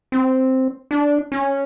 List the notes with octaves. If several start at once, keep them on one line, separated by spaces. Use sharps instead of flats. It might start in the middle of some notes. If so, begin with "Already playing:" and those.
C4
D4
C#4